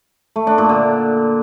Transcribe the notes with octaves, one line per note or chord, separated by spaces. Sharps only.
A3
D4
A#2
D3